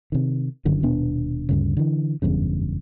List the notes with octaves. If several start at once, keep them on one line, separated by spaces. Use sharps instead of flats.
C3 D#3
G1 F#2 D3 D#3
D#1 B2 B3 D4
D2 G2 C#3
D3 E3
F#1 E2 G2 C#3